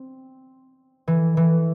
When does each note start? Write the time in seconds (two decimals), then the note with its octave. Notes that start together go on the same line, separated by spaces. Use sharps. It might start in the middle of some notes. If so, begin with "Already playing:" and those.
Already playing: C4
1.08 E3
1.37 E3